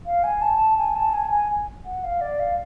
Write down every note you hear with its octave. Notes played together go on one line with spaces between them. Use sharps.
F5
G#5
A5
G#5
A5
G#5
G#5
F#5
F5
D5
F5